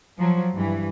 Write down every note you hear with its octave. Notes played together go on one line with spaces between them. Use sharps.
F3 F#3
G2 E3